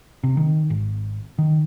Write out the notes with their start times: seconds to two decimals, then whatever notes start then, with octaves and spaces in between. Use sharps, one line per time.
0.24 C3
0.37 D#3
0.70 G#1
1.39 D#3